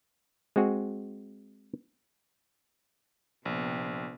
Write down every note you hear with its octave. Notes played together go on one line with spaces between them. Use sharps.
G#3 C4 F#4 G#4
A#1 C3 B3